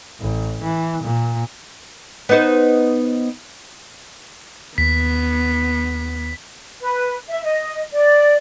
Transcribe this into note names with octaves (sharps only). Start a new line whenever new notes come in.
A1
E3
A#2
B3 D#4 C5
D#2 B3 B6
B4
E5
D#5
D5